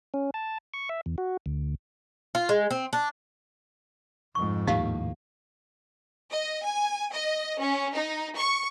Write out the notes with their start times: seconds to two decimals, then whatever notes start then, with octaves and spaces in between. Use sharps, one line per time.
0.14 C#4
0.34 A5
0.74 C#6
0.89 E5
1.06 E2
1.18 F#4
1.46 D2
2.35 F4
2.49 G#3
2.71 C4
2.93 D4
4.35 F2 G#2 C#6
4.67 D#2 A2 A#3 D#4 G4 F5
6.30 D#5
6.65 G#5
7.13 D#5
7.60 C#4
7.94 D#4
8.36 C#6